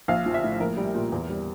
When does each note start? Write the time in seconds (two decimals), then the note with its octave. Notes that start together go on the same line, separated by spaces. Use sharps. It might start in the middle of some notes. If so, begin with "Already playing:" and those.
0.08 A#1 F5
0.26 F3
0.34 E5
0.44 A2
0.60 A#1 A#4
0.77 G3
0.95 A#2
1.12 E2
1.29 G3